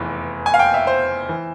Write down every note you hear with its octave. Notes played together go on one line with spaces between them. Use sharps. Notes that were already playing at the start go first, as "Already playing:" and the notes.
Already playing: F1 E2 E3
G#5
F5
G5
E5
C5
E3